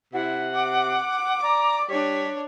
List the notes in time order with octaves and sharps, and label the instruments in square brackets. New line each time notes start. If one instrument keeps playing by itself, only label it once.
[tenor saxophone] C3 [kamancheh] E4 [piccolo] F#5
[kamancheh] D6
[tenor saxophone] D5 [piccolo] A#5
[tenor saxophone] G3 [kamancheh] D4 C#5 [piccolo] B6